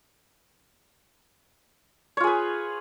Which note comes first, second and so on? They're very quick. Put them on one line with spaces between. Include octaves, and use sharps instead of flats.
C#5 F4 G#4 B4